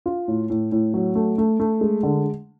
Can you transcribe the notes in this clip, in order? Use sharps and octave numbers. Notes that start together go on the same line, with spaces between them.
F4
A2
A2
A2
F#3
A3
A3
A3
G#3
D3